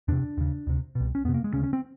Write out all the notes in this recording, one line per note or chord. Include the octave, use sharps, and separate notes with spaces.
E2 C3 D4
D#2 C#3
D2 C3
C2 B2
C#4
F2 C3 B3
A#3
G#3
D2 C#3 C#4
C#4
C4